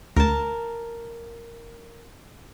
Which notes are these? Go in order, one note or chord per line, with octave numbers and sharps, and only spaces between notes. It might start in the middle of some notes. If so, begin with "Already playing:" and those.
D2 A#4 A5